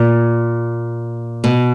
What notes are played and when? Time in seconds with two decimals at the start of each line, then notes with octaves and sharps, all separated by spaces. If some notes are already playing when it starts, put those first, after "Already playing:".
Already playing: A#2
1.44 B2